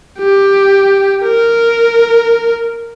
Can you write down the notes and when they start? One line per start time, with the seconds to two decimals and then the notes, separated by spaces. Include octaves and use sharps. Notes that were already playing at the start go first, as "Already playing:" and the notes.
0.19 G4
1.23 A#4